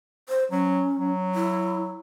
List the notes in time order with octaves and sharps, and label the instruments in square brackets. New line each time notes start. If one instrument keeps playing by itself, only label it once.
[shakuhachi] C5
[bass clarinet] F#3 [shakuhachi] C#4
[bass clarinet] F#3
[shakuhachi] E4